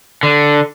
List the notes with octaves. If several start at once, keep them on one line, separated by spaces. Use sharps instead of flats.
D3